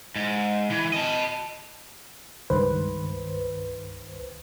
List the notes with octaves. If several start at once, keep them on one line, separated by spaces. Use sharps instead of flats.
G#2
E3
D#5 A5
C#2 G2 D#3 B4 C5